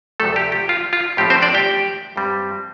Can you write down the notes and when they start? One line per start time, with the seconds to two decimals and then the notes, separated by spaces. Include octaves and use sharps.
0.20 D2 C3 F3 A3 A4
0.36 G4
0.52 G4
0.69 F4
0.93 F4
1.17 A2 F3 A3 C4 F4 G4
1.30 C4 C5
1.42 D4 D5
1.54 G4 G5
2.16 G2 G3 C4